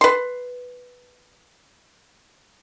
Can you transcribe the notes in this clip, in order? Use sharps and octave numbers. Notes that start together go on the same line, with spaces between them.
B4 C6